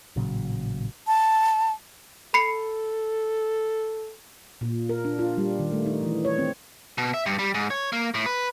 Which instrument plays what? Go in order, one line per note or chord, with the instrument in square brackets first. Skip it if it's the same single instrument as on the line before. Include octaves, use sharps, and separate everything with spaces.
[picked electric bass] A1 A#2 C#3 F#3
[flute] A5
[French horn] A4 [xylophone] B5 C7 C#7
[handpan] A#2
A#4
D4
F4
G3
D#3
A3
D#4
E3
C#5
C4
[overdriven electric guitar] B2
E5
G2
G3
G#2
C#5
A#3
A2
B4